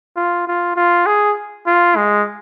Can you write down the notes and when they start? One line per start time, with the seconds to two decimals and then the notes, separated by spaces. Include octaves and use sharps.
0.16 F4
0.47 F4
0.76 F4
1.06 G#4
1.67 F4
1.96 G#3